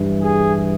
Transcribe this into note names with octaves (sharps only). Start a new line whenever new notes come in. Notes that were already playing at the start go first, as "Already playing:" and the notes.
Already playing: G2 E3
G#4